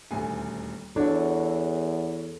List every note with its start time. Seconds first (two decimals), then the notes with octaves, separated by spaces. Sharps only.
0.11 D#1 D2 G#5
0.96 E2 D4 F#4 A4 C#5